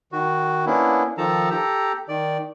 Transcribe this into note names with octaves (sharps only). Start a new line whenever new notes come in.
D#3 F#4
A#3 B3 C#4 D4 E4
D#3 F3 A4 A5 A#5
G4 A4 A#5
D#3 D5